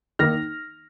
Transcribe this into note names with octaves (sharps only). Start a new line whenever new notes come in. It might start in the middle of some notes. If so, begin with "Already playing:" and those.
D#3 A#3 D#4 F6 A#6